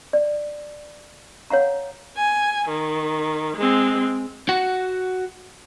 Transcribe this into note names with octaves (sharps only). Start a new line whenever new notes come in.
D5
C#5 F5 F#5 A#5
G#5
D#3
G#3 C4
F#4 F#5